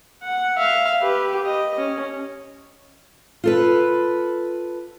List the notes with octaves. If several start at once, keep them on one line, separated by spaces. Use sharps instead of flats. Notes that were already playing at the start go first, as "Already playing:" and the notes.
F#5
E5 F5
G4 B4
D#5
C#4
F4 A4 B4